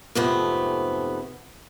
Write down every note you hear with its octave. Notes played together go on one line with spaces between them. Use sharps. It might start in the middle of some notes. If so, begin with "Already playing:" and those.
F2 G#2 C3 A3 B3